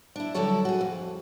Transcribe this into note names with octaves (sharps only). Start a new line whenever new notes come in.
D4 E4
D3 F#3 G3 E4 A4 C#5
F#4 G#4
F2